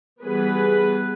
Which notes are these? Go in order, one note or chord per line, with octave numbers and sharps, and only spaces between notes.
E3 G3 B3 G#4 B4